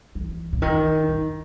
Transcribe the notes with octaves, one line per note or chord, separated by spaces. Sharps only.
E3
C#3
D#3
D#3